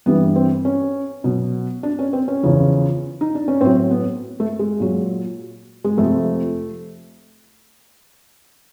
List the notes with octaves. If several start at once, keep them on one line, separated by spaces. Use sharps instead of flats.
G2 E3 G3 B3
C4
C#4
B2 F#3
D4
C#4
C4
C#4
E2 C#3 F3
D#4
D4
C#4
A2 F#3 C4
B3
A3
G#3
A#2 F#3
G#3
F2 C3 F3 A3